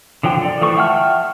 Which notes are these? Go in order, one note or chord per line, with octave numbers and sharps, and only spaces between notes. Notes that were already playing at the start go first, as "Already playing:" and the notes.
D3 F3 F#3 G5
A4 D5
E3 F3 A3 C#6
E5 F#5 G5 A5 F6